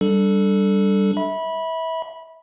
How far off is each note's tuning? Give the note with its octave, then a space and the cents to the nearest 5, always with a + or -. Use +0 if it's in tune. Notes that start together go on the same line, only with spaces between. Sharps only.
G3 +0 D4 +0 A4 +0
E5 -25 B5 -15